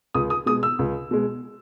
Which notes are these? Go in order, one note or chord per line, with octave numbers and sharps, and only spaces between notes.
C#2 D#6
D#6
B2 G#3 D#6
E6
C#2
B2 G#3